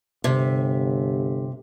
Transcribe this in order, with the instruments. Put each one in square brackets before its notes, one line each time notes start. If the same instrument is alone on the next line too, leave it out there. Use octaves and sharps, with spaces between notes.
[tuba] G1 [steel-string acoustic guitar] C3